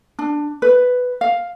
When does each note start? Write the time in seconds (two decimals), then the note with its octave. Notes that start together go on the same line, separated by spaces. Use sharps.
0.19 D4
0.62 B4
1.21 F5